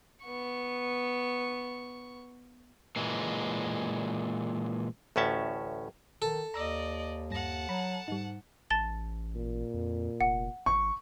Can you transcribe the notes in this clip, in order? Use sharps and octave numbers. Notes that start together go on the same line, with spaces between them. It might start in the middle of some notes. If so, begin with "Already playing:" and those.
B3 C#6
A#2 E3 G#3
A1 D2 A2 C#4 E5 A5
D#3 A4
D#2 D5 D#5 A#5 E6 A#6
G2 F#5 A5 A#6
F#3 A#5 B5
G#2 G3 D#4
A1 A5 A6 G7
A#2
F2
F1 F#5
G#1 C#6